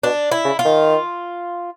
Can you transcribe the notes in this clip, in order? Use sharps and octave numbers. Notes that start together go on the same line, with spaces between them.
B2 D4
E4
C#3
F4
D#3